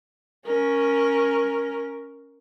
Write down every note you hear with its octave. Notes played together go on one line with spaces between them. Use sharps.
C#4 A#4